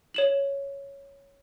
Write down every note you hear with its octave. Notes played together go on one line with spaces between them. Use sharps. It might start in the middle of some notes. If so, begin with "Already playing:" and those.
C#5 E7 F#7